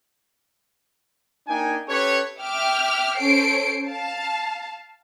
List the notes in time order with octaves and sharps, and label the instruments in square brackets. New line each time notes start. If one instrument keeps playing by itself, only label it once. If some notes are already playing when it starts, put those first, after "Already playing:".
[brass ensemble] A#3 D4 D#4 G5 G#5
C#4 G4 A4 B4 C#5
[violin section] E5 G5 D6 F6
C#4 A4 C5 C7 D7
F5 A5